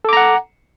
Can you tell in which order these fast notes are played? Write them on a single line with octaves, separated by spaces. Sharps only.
A4 D6 A#5 F#5